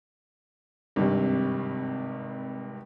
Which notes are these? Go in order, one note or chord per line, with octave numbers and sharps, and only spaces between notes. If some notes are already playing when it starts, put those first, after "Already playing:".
G#1 G2 C3